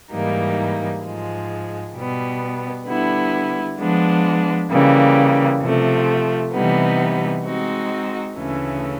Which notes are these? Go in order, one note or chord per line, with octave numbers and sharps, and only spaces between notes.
G#2 E3 G3 A#3 D#4
G#2 F3 G#3
B2 G3 B3
D3 G3 B3 E4
F3 G#3 B3 D4
C#3 E3 G3 A#3
C3 F3 A3
C3 E3 G3 B3 D#4
G#3 C4 D#4 F#4
D2 C#3 E3 A3 C#4